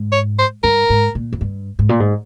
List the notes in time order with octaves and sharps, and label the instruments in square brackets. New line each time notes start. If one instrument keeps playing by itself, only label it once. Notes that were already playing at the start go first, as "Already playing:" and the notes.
Already playing: [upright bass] G#2
[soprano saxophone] C#5
C5
[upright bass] G2 [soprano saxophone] A#4
[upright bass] G#2
A#2
F2
G2
G#2
A#2
G#2